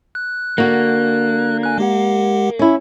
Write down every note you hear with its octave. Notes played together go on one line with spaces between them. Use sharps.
F#6
D3 A#3 F#4
G#5 F#6
G#3 G4 F#5
C#4 E4